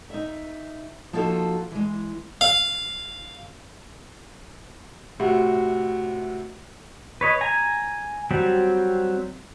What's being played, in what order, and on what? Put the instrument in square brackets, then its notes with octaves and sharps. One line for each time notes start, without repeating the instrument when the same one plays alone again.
[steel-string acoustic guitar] D#4 E5
F3 A#3 D#4 F4 F#4 A4
E3 G#3
[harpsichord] F5
[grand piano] A2 C3 F#4
[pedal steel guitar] B4 C#5 D#5
G#5 A#5
F#3 G3 C4